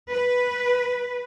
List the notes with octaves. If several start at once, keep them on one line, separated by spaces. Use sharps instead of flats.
B4